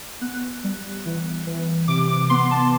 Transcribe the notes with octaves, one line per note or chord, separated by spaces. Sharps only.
B3 F#6
G3
E3
E3
C3 D6
D6
B3 C6
A5